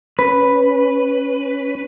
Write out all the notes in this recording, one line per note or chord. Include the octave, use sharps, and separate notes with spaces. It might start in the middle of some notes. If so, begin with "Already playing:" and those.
C#4 B4